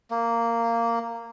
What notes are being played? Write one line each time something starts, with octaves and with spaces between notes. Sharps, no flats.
A#3